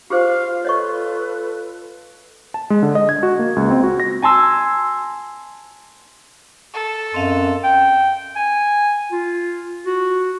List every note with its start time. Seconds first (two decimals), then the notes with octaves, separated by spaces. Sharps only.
0.10 F4 G4 G#4 C5 F5 F6
0.65 A4 B4 C#5 D#5 C#6
2.54 A5
2.70 G#3
2.82 D3
2.95 D#5
3.09 G#6
3.23 F#4
3.39 A#3
3.56 C#2
3.70 C4
3.83 F#4
4.00 A#6
4.22 G#5 A5 C6 E6
6.74 A4
7.14 F#2 C4 D#5 F5
7.64 G5
8.36 G#5
9.12 F4
9.86 F#4